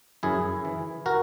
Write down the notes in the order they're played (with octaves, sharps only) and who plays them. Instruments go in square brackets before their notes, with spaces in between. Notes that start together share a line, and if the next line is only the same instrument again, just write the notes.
[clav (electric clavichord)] F#2 E4 G#4
E3
F#4 A#4